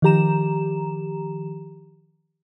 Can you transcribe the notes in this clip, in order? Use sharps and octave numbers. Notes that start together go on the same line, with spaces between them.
D#3 F3 G4 A#5 E7